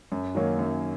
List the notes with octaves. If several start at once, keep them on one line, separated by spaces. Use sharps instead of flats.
F#2
D#3 F#3 A#3 C#4
F#2